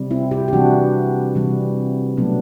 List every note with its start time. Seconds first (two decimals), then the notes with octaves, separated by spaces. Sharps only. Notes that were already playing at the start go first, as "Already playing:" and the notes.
Already playing: C3 G3
0.11 C4 E4
0.31 E4 G4
0.48 G4
0.53 C3 E3 G3 D4 F#4
1.35 C3 E3 G3
2.17 B2 F#3 A3 B3 D4